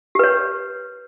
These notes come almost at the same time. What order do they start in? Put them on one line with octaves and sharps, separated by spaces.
G4 B4 C#5